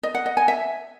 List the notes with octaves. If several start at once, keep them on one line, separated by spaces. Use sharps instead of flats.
D#5
F#5
D#5
G#5
E5